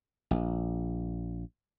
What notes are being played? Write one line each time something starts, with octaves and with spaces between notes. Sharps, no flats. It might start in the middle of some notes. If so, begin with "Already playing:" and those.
A#1